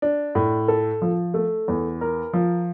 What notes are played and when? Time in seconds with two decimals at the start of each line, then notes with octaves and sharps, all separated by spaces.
0.02 D4
0.35 A2
0.68 A4
1.02 F3
1.34 A3
1.68 E2
2.01 A#4
2.33 F3